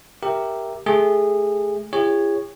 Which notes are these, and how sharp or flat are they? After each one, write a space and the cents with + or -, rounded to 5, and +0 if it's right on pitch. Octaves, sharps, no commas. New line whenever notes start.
G4 +0 A#4 +0 E5 +0
A3 -25 G#4 -25
E4 +40 G#4 -45 C#5 +0